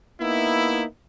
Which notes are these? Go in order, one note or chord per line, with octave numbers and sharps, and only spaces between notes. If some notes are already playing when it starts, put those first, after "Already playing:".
A#3 B3 D#4 E4